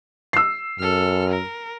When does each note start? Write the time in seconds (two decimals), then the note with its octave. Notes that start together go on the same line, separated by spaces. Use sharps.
0.33 E6 C7
0.80 F#2 A4 F6
1.30 A#4